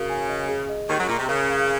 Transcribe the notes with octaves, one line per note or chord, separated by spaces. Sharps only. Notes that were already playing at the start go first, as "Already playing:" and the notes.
Already playing: C#3 F#4 A#4 F5
G#5
D#5
G#4
D#5
D#2 D#3 C#6
F#2 F#3
A#2 A#5
C3
C#3 A#4
F5